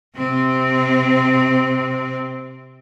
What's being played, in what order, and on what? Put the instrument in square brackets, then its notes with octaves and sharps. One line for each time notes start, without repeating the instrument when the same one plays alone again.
[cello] C3 C4